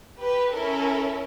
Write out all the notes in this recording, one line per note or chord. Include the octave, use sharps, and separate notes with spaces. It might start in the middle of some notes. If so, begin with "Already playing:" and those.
G4 B4
C#4 E4 A4 A#4